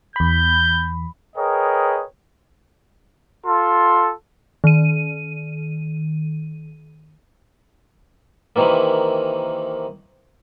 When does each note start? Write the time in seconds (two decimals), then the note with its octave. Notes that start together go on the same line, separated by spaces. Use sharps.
0.16 E2 B5 G6
1.36 G#4 A#4 B4 C#5 D#5 G5
3.46 F4 A4 C6
4.64 D#3 D#7
8.56 C3 D#3 E3 A#3